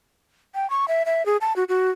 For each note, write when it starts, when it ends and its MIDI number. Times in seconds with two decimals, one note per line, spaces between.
0.55 0.69 79
0.70 0.88 85
0.88 1.03 76
1.06 1.25 76
1.26 1.37 68
1.41 1.55 81
1.56 1.64 66
1.69 1.91 66